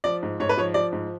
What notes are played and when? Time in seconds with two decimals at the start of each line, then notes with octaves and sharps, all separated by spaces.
0.04 F3 D5
0.23 G#2
0.40 G#2 C#5
0.49 B4
0.57 F3 C#5
0.74 F3 D5
0.92 G#2